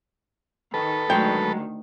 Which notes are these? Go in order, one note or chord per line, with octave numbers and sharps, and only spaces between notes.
D#3 A4 B4
D2 D#3 F#3 G#3 G5